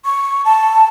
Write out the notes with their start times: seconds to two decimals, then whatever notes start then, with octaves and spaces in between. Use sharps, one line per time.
0.05 C#6
0.45 A5